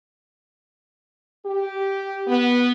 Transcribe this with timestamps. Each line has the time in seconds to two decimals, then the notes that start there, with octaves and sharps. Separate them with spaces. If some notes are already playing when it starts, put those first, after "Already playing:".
1.45 G4
2.28 B3